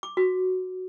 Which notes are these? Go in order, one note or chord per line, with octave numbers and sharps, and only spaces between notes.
D6
F#4